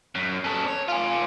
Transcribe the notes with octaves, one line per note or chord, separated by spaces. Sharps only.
F#2
C#4 A4
C#5
F4 G#5